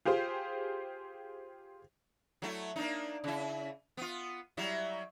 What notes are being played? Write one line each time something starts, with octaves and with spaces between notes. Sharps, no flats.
F4 G4 G#4 C5
F#3 A3 E4
A#3 D4 D#4
C#3 E4
B3 F4
F#3 G3 E4